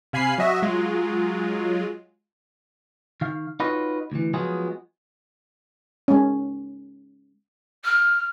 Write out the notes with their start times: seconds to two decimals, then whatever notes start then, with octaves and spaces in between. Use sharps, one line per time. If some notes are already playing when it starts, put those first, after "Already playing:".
0.13 C3 F5 G#5 B5 C7
0.38 F#3 F#4 D#5 E5
0.62 F#3 G#3 F4
3.21 D#3 F5
3.60 D#4 F4 F#4 B4 C#5 D#5
4.12 D2 E3
4.34 F3 F#3 G#3 B3 F4 G#4
6.08 G#3 C#4
7.84 F6